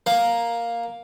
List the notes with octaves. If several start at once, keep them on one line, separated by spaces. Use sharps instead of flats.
A#3